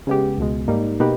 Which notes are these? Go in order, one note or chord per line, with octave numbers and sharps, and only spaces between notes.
C#3 G#3 B3 G4
C#2 B2 G#3
G#2 G3 A#3 D#4
B2 A#3 D#4 G4 B4